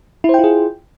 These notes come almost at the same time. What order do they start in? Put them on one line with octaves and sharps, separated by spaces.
E4 C5 G5 F4 G#4